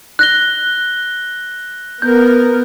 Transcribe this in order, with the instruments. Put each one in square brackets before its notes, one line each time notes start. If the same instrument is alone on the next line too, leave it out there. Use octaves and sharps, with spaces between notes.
[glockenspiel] F#6 A#6 G7
[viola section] B3 A#4 [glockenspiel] G6